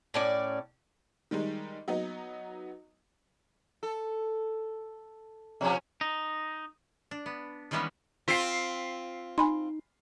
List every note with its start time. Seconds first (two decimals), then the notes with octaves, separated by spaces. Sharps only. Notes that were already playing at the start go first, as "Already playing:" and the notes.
0.14 A2 C#4 D5
1.31 D#3 G3 G#3 D#4
1.88 F#3 B3 D#4 D#5
3.83 A4
5.61 B2 F3 C#4
6.01 D#4
7.11 D4
7.26 B3
7.71 D#3 E3 G3 G#3 B3 C#4
8.28 C4 F4 B6 C7
9.38 D#4 G#5 B5 C6